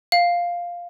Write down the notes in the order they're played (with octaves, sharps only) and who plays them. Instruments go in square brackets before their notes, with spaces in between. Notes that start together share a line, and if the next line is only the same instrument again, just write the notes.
[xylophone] F5